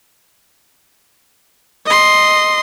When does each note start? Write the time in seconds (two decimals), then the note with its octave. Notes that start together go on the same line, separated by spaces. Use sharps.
1.86 D#5 C6